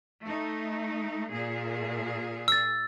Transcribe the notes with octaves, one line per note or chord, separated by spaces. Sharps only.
A3 D#4
A#2 G#4
E6 A6